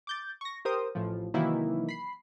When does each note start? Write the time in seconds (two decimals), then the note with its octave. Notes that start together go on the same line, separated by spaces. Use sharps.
0.07 D6 G6 A6
0.41 C#6 A#6
0.65 G4 A#4 C5 D#6
0.95 A1 A2 F3
1.34 C3 D#3 E3 F#3 A#3 E4
1.89 B5 C7